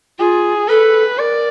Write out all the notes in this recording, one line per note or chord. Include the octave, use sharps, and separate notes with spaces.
F4 G#4
A4 B4
A#4 D5